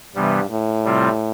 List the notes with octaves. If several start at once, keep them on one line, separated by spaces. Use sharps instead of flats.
G2 C3 E3 G3 B3
A2
C3 G3 C4 F4